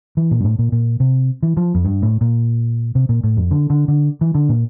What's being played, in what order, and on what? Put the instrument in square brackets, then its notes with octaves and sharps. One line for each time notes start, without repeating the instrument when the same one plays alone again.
[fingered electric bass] E3
A#2
G2
A2
A#2
A#2
C3
E3
F3
F2
G2
A2
A#2
C3
A#2
A2
F2
D3
D3
D3
E3
D3
A#2